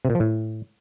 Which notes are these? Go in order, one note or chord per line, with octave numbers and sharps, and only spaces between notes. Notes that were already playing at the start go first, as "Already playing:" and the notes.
C3
A#2
F3
A2